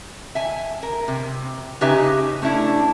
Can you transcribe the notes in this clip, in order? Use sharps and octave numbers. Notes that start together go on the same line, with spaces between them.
E5 G#5
A#4
C3
C#3 D#4 G4 B4 E5 G#5
A3 C#4 D4 E4